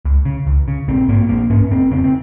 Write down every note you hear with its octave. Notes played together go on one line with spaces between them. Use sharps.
C#2
C#3
C#2
C#3
A#1 C4
G#2 A#3
A#1 A#3
G#2 C#4
F1 C4
F2 C#3 C4
C4